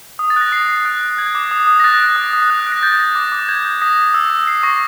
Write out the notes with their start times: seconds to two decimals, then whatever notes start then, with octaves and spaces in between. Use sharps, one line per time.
0.19 D#6
0.30 A6
0.36 F#6 A#6
0.52 D#6 C7
0.68 D#6
0.85 F#6
1.01 F#6
1.18 F#6 G#6
1.35 D6
1.51 D#6
1.67 D#6
1.80 A#6
1.84 F#6 A6
2.00 F#6
2.16 D#6
2.33 D#6
2.50 F#6
2.67 F#6
2.72 A#6
2.83 G6 A6
2.99 G6
3.15 D6
3.32 D6
3.48 G6 G#6
3.65 G6 G#6
3.81 D#6 A#6
3.98 D#6
4.14 E6
4.30 E6
4.47 E6 C7
4.63 C#6 A#6